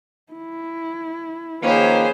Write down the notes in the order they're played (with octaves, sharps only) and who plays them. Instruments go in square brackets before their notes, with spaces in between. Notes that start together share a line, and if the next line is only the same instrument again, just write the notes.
[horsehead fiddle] E4
[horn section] D#3 F3 A#3 [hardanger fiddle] C#4 C5 [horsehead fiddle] G#4 B4